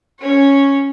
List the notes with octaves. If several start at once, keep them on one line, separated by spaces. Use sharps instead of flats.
C#4 C#5